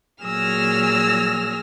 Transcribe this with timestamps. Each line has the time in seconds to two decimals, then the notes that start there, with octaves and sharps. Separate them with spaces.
0.24 A#2 F#3 G#4 E6 F6 A#6